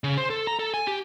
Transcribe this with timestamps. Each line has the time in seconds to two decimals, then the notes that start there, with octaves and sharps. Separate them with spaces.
0.04 C#3
0.17 C5
0.30 A4
0.47 A#5
0.59 A4
0.74 G#5
0.87 G4